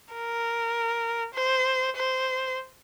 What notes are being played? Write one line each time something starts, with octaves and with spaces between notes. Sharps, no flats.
A#4
C5
C5